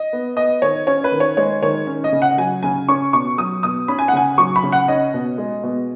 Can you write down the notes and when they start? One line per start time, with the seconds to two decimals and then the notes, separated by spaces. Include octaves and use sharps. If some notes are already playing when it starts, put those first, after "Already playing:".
Already playing: D#5
0.13 B3
0.37 B3 D#5
0.62 D#3 C#5
0.87 C#4 C#5
1.04 B4
1.12 D#3
1.20 C#5
1.37 G#3 C#5
1.62 D#3 C#5
1.87 C#4
2.04 D#5
2.12 C#3
2.22 F#5
2.38 F#3 G#5
2.63 C#3 G#5
2.89 C#4 C#6
3.13 B2 C#6
3.38 F#3 D#6
3.63 B2 D#6
3.88 C#4 B5
3.99 G#5
4.08 F#5
4.13 C#3 G#5
4.38 F#3 C#6
4.56 B5
4.63 C#3
4.72 F#5
4.88 C#4 D#5
5.14 B2
5.38 G#3
5.63 B2